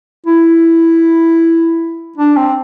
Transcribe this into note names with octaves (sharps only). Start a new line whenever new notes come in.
E4
D4
C4